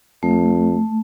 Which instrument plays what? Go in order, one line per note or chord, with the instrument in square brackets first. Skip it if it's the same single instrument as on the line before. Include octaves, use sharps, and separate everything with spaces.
[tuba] F2 [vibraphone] A3